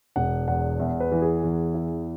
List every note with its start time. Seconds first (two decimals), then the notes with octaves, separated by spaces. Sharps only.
0.16 E1 F#5
0.48 E2 F#5
0.80 E2 E5
1.00 B4
1.12 E3
1.22 G#4
1.44 E2
1.74 E4